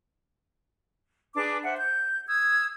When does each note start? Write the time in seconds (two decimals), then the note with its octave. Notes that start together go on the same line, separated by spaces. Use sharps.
1.35 D4 G#4 B4 D6
1.63 C5 E5 F#5
1.78 G6
2.27 D#6 E6 G#6